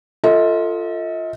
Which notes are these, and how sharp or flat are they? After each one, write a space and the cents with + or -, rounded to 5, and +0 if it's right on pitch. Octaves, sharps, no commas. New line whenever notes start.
F4 +0 A4 +20 D#5 +40